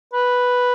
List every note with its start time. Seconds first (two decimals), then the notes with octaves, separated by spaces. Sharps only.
0.13 B4